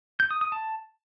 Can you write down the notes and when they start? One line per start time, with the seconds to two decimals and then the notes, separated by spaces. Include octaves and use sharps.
0.20 G6
0.31 D#6
0.41 D#6
0.52 A5